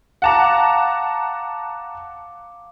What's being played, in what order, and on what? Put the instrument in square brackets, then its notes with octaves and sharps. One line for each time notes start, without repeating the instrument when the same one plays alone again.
[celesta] F5 D6 [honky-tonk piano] F#5 A5 A#5